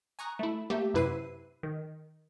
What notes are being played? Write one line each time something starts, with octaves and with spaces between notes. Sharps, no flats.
G#5 A#5 C#6 D#6 F#6
A3 E4
A3 A#3 G4 E5
F#2 C3 E4 B4 C7 D#7
D#3